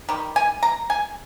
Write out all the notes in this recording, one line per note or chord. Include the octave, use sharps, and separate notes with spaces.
D#3 G3
G#5
A#5
G#5